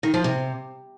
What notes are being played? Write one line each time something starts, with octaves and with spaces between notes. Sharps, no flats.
D#3
F3
C3